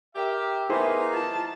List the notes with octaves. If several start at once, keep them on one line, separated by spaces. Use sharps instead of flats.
G4 A#4 E5
A#3 B3 D#4 E4 G#4 C5
F4 A5